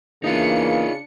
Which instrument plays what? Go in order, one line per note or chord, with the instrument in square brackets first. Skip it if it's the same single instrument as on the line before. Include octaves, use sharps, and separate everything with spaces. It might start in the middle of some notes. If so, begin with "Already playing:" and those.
[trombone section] E2 E3 A#3 [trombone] C#3 [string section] D4 C#7 [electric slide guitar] D#4 F4